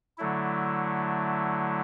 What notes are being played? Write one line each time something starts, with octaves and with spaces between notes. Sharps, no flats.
D3 F#3 A3 E4